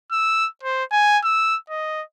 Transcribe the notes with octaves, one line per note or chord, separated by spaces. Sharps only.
E6
C5
G#5
E6
D#5